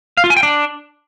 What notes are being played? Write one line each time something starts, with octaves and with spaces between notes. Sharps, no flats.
F5
F4
G#5
G5
D4